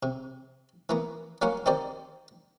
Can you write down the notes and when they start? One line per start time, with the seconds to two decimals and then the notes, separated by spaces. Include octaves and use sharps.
0.03 C3
0.89 E3 A#3 B3
1.42 F#3 A#3 C#4 F5 F#5
1.66 D#3 C4 D#4 G4 C5 D5